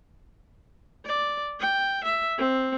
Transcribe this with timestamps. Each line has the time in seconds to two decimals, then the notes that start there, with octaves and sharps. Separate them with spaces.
1.05 D5
1.60 G5
2.04 E5
2.38 C4